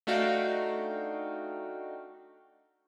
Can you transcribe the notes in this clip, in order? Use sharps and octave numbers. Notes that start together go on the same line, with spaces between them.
A3 D4 D#4 F#4 F5 G5